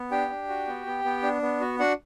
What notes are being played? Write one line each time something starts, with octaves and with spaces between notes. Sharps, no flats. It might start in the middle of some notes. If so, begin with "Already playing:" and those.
Already playing: B3
D4 G4 G5
D4
F#4
B3
B3
B3
D4
B3
F#4
D4 F#4 F#5